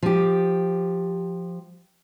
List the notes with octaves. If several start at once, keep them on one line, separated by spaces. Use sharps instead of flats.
F3 G4